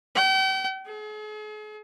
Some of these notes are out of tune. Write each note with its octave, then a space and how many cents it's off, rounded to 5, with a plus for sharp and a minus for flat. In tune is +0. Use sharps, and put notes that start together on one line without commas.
G5 -40
G#4 +40